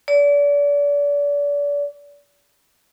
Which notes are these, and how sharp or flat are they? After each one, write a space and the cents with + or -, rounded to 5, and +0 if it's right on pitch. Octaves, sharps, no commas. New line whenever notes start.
D5 -35